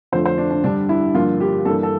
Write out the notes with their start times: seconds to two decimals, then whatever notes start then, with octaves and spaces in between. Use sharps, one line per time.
0.12 F2 D3 F3 A3 C5
0.26 C5
0.38 D4
0.51 D4
0.64 G2 D3 G3 D4
0.89 E4
1.15 G2 D3 F3 A#3 F4
1.40 G4
1.65 G2 E3 A#3 A4
1.83 A4